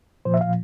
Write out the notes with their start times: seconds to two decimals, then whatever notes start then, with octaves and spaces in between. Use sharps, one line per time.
0.25 A#2 F3 C5
0.34 E5
0.41 F5